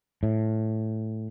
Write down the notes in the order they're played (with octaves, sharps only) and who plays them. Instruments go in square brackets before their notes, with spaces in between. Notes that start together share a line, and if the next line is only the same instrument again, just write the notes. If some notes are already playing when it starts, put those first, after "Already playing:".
[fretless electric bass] A2